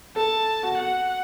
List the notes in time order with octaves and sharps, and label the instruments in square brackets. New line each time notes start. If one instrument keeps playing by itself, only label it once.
[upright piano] A4 [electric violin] A5
[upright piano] F#4
[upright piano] F#4 [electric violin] F#5